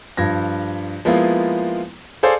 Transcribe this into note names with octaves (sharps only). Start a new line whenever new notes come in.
G2 F3 G#6 A#6
F3 G#3 A#3 B3 E4 F4
G#4 A4 C5 D5 F5